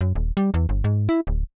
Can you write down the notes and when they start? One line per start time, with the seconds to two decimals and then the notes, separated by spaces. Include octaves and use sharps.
0.01 F#2
0.15 D#1
0.37 G3
0.54 E2
0.69 G1
0.84 G#2
1.09 E4
1.27 D1